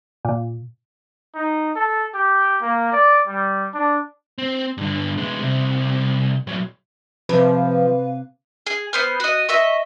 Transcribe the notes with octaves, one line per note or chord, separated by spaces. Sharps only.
A#2
D#4
A4
G4
A#3
D5
G3
D4
C4
G2 D3
G#3 B3
C2 C3
A#2 F#3
C3 F3 B4 F5
G#4
B3 C5 F6
F#4 D#5
D#5 E5 C#6